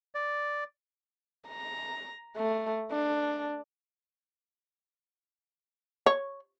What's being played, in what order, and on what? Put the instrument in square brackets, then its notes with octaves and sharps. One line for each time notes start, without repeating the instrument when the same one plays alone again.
[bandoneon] D5
[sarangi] A#5
A3
D4
[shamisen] C#5